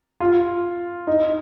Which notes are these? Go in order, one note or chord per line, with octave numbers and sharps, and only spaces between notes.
F4
D#4